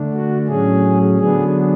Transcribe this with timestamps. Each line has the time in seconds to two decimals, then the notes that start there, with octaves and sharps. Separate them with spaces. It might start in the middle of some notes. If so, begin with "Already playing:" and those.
Already playing: D3 A3 D4
0.13 F#4
0.48 A2 F#3 C#4 G#4
1.19 D3 F#3 B3 D4 G#4